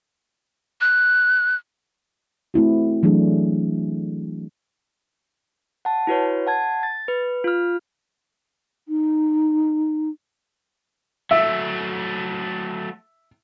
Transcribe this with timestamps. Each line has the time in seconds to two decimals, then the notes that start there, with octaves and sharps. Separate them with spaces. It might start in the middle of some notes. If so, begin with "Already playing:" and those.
0.81 F#6
2.54 A3 C4 E4 F#4
3.03 E3 F#3 A3 D4 G#4
5.85 F#5 A5
6.07 E4 F#4 B4 C#5
6.47 F#5 A5 G#6
6.83 A6
7.08 B4
7.44 F4 F6
8.89 D#4
11.31 F#3 A3 E5